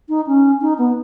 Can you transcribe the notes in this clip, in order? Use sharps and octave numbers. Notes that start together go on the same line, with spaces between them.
D#4
C#4
D#4
B3